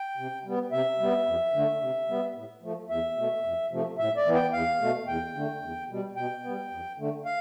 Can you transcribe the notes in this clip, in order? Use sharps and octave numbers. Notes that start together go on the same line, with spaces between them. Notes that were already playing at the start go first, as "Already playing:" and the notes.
Already playing: G5
C3
G3 B3
C3 E5
G3 B3
F2
D3 A3
C3
G3 B3
A2
F3 A3
E2 E5
B2 A3
F2
C3 F3 A3
A2 E5
D5
E3 B3
G5
E2 F5
B2 A3
E2 G5
D3 A3
E2
B2 G3
B2 G5
G3 B3
F2
D3 A3
F5